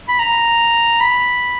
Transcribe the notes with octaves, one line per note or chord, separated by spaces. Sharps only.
B5
A#5
B5